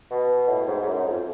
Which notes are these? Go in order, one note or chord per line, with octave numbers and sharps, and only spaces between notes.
B2
A2
G#2
G#2
F#2
F2